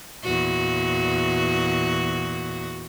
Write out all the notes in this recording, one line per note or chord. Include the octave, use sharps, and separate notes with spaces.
E2 A#2 F#4